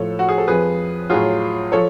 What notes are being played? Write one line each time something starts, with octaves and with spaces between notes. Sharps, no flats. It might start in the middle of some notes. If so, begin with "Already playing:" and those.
Already playing: A2 F3 A4 C#5
F#4
G#4
A4
F2 F3 G#4 B4
A2 F#3 F4 G#4
F3 A4 C#5